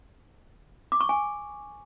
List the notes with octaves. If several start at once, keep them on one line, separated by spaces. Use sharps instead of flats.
D6
C#6
G#5